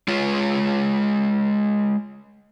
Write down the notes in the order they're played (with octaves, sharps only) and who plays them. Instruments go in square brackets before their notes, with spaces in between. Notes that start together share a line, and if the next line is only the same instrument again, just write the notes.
[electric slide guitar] G#3 F4 C#5